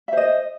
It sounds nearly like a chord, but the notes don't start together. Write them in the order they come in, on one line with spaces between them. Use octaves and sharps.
E5 C5 D#5